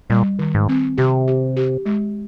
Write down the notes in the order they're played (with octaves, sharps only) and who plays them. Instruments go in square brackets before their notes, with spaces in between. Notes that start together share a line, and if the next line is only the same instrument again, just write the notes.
[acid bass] A#2 [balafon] G3
[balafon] D#3
[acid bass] G#2
[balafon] C4
[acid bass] C3 [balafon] G4
[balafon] G4
G4
G#3